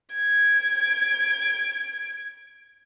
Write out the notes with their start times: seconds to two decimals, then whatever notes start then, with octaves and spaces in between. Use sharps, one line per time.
0.14 G#6 D7